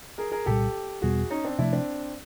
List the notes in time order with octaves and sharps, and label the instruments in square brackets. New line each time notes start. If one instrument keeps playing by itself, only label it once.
[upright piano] G#4 A#4
G#4 A#4
[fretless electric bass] C2 A#2 G3 [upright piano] G4 A4
[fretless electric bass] E2 B2 G3 B3 [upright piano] F#4 G#4
[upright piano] C#4 D#4
C4 D4
[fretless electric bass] C3 F3 A3 [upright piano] D4 E4
[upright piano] C4 D4